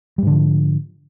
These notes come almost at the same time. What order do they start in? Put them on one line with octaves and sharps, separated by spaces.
G3 G#2 D3 F3